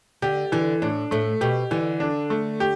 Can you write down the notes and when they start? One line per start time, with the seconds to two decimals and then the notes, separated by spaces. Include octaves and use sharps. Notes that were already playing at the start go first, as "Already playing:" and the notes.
0.22 D3 G4
0.52 D3 E3
0.82 A2 D4
1.11 A2 A3
1.41 B2 G4
1.71 D3 E3
2.00 D4
2.30 A3
2.60 G4